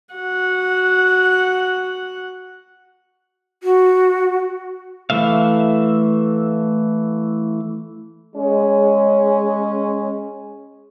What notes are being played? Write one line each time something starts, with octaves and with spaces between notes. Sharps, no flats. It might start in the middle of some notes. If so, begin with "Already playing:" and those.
F#4 F#5
F#4
E3 A3 E5 F5
G#3 C#4